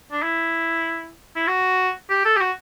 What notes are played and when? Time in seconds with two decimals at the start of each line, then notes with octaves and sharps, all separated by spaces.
0.12 D4
0.23 E4
1.36 E4
1.47 F#4
2.10 G4
2.25 A4
2.36 G4
2.41 F#4